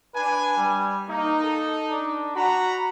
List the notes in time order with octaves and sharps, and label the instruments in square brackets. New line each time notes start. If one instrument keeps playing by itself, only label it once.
[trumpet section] D4 G#5 [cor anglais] B4
[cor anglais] G3
[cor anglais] A#3 [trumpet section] D#4
[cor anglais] A4
D4
[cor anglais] F#4 [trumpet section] F#5 A#5 B5